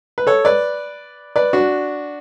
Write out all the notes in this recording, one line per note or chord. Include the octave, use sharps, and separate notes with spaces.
B4
A4 C#5
B4 D5
B4 D5
D4 F#4